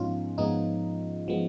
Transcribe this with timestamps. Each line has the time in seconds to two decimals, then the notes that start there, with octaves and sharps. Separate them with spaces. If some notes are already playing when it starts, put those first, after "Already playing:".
Already playing: G#2 F3 G#3 B3 C#4 D#4 F4
0.38 G#2 F3 G#3 B3 D#4
1.28 F3 G#3 B3